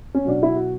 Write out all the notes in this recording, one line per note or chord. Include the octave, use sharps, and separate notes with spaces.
C#4
B2 F#3 D4
E4
F#4